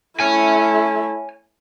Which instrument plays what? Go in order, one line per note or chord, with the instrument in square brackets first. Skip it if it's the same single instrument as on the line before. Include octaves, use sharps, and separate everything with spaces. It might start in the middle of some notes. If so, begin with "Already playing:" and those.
[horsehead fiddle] A3 E4 [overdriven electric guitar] C#5 G#5